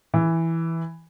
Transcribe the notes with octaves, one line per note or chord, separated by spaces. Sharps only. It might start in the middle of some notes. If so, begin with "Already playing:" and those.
E3